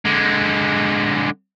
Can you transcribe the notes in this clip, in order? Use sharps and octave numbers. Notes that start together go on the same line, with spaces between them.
D3 G#3